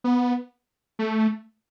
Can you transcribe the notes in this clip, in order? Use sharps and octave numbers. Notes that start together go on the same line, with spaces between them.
B3
A3